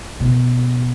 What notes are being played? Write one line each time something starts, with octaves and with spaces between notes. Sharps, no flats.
B2